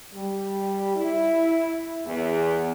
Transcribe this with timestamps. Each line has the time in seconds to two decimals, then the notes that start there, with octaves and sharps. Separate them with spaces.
0.12 G3
0.95 E4
2.05 E2